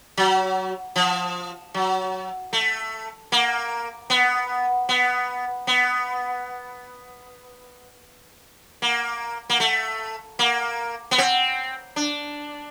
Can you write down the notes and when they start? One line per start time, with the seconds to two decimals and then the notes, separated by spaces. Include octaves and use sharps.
0.17 F#3
0.96 F3
1.74 F#3
2.53 A3
3.32 A#3
4.10 B3
4.89 B3
5.67 B3
8.82 A#3
9.50 A#3
9.60 A3
10.39 A#3
11.11 B3
11.18 C4
11.96 D4